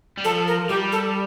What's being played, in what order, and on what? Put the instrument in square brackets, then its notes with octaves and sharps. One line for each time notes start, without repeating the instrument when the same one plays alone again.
[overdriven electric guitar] G3
[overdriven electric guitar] F3 [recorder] A4
[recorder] A#4
[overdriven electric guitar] G3 [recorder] G4
[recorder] A4